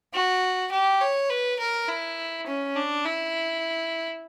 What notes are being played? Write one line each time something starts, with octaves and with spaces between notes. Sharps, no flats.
F#4
G4
C#5
B4
A#4
E4
C#4
D4
E4